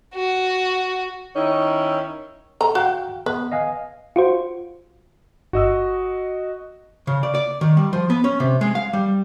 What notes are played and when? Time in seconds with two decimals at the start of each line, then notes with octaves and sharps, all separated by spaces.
0.14 F#4
1.36 D#3 C#4 D#4 E4
2.61 A4 A#5
2.75 F#4 F5 G5
3.26 B3 B4
3.52 D#5 F5 G#5
4.16 F4 F#4 C5
5.53 G1 F#4 D#5 E6
7.07 C#3
7.23 D5
7.35 D5
7.61 D#3
7.77 G3
7.93 F3
8.10 B3
8.24 C#4
8.40 C3
8.61 G#3
8.75 F5
8.93 G3